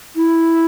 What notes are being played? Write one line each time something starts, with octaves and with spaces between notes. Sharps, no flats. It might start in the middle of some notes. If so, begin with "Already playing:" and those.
E4